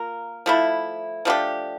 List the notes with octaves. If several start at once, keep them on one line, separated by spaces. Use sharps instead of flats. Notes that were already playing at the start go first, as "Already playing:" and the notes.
Already playing: A#3 F4 A#4
F3 A3 E4
F3 A3 D4 G4